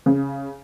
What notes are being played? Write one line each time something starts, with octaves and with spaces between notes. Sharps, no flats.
C#3